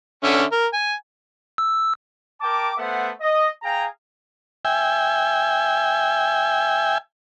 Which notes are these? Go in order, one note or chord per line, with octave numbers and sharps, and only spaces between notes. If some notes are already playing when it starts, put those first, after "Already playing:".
D3 C#4 E5
A#4
G#5
E6
A#4 G5 A5 D6
A3 B3 A4 C5 E5 F#5
D#5
G#4 F5 G5 G#5 A#5
E5 G5 G#5